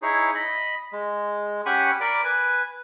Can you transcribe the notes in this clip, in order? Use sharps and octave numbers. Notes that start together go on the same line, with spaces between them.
D#4 E4 G#4 C#5
D#5 B5
G#3
C#4 G4 F#5 G#5 B5 C#6
A#4 D5 B5 D6
B4 G#5